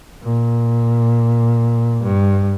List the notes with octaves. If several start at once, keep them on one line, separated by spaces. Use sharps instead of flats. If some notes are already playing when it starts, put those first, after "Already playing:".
A#2
G2